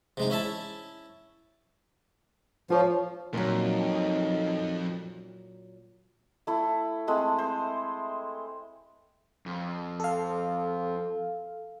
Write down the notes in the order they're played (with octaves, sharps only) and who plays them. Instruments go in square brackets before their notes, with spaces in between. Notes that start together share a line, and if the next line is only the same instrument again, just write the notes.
[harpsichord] C3 G#3 D#4
C#4 E4 E5 A5
[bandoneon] F3 [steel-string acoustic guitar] F4 C#5
[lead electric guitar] F2 [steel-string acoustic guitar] A#2 F#3 [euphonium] D#4
[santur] A3 E4
G#3 A3 C4
C5
[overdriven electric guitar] F2
[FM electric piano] A4 F5